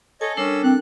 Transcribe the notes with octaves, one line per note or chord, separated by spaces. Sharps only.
A4 C#5 D#5 G#5
G3 C#4 D4 A#4 E6
C4 F#6